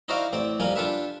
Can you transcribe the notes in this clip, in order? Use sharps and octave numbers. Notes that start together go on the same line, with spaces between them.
D#4 E4 F#4 C5 D5 F5
A1 C4 D5
F2 G3 A#3 G#5
D4 F4 G4 A4 B4 E5